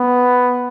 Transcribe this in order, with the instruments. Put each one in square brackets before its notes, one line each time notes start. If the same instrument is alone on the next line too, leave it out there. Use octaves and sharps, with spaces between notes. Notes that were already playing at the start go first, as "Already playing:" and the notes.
Already playing: [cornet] B3